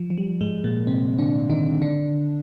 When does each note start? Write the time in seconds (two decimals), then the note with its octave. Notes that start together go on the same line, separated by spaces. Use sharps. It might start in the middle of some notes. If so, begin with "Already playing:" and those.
Already playing: F3
0.10 F3
0.18 G3
0.41 G#2 G#3
0.64 A#2 A#3
0.87 C3 C4
1.18 D3 D4
1.50 D#3 D#4
1.82 D3 D4